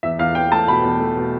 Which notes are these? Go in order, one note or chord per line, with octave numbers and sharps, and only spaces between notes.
E2 E5
E2 F5
E2 G5
A3 A5
B2 B5
E2
A3
B2